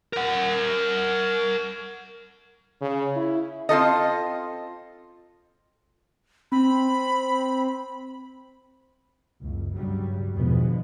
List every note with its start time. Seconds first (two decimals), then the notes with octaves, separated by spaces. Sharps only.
0.13 A#4 F#5
2.81 C#3
3.16 E4
3.69 C4 F4 A4 D#5
6.52 C4 B5
9.42 F#1 C#2
9.74 G2 C#3 F#3 G3
10.34 E2 B2 D3 F3 G#3 B3